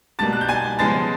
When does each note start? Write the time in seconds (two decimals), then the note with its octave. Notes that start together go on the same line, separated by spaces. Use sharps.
0.19 B2 G3 A#3 A5 A6
0.33 F#6
0.41 G6
0.48 G#5 G#6
0.79 C#3 F3 G#3 B3 A5 A6